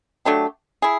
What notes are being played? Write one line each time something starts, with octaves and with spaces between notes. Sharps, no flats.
F#3 A3 D4 G4
E4 G#4